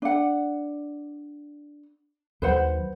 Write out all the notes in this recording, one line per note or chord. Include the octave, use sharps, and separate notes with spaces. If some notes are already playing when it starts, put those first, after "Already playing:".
D4 F#5
D#2 D#3 F#3 B4 C5 F#5